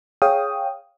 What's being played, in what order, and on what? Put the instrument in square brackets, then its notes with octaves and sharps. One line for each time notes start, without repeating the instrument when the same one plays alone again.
[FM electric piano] G#4 C#5 F5 G5 D#6